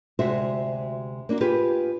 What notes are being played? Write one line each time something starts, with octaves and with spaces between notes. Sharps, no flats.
D2 C3 G#3 F#4 C5 E5
A#3 D4 F4 F#4
F4 G4 G#4 B4